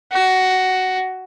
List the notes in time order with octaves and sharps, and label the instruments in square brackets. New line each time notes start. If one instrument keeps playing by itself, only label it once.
[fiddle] F#4